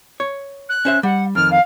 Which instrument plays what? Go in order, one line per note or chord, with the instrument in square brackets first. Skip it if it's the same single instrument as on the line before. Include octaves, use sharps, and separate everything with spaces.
[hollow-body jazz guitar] C#5
[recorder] F#6
[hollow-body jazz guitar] C#4 C5 E5
[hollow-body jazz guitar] G3 [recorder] F#5
[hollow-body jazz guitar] F2 D#3 [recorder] F6
[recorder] F5